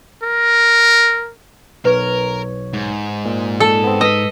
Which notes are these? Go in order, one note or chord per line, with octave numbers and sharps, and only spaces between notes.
A#4
B1 A#4 B4 C#5
G#2
A#2
A4
B3 C4
A4 B4 D#5 E6 B6